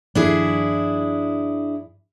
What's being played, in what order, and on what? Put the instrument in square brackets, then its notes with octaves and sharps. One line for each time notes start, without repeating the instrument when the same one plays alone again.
[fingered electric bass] G2 D#3 F3 [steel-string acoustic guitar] D4 E4 G#4